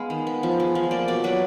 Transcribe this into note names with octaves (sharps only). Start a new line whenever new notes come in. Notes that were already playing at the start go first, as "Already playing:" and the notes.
Already playing: G#3 B3 F5
D#3
B3
F3
G#3
F3
A#3 D5
B2 D5
F#3 B4